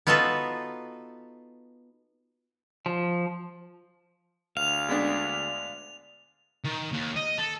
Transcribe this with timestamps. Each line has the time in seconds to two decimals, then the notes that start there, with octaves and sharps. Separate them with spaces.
0.07 B3 D#4 F4 F#4 A4 B4
2.86 F3
4.57 D2 F5 F7
4.89 G#3 B3 D4
6.65 D#3
6.93 D#2
7.17 D#5
7.38 A4